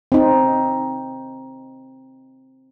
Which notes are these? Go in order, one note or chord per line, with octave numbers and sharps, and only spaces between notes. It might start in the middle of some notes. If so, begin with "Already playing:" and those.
C4 D#4